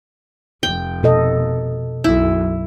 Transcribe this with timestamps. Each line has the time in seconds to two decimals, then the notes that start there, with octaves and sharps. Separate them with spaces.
0.63 F1 G5
1.03 B2 A4 D#5
2.04 B1 F#2 E4